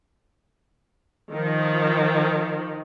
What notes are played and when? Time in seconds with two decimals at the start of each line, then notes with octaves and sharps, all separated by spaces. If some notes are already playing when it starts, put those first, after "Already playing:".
1.33 D#3 F3